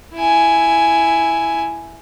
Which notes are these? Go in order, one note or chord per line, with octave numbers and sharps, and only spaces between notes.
E4 G#5